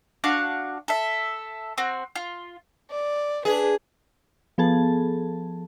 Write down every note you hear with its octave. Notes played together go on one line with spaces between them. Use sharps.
D4 F#4 F5 A5
A4 E5
C4 F#4
F4
D5
D4 G#4 B4
F3 B3 G#4 A4 A5